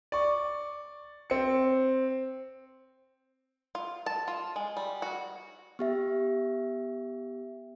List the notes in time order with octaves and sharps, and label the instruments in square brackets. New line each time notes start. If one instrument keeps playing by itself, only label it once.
[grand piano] D5 C#6
C4 C#7
[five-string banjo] F4
A5
F4
G#3
G3
F#4
[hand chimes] B3 G4 E5